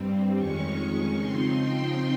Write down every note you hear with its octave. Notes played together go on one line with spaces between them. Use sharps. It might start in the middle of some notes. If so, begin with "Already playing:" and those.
Already playing: G2 G3 C4
F2 D#3 G#3 C#4 C#6
C#3 F3 C4 D#4 C6
G5